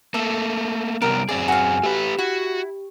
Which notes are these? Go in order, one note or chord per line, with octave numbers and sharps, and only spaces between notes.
A3 A#3 A4
C3 G3 B3 A#4 D7
F#2 C4 G#4 D5
F#4 F5 G#5
A3 G4 B4
E4 F#4